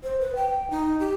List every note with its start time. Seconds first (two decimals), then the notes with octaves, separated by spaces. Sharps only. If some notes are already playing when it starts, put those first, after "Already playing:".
0.03 C5
0.20 B4
0.35 G5
0.70 D#4
1.00 G4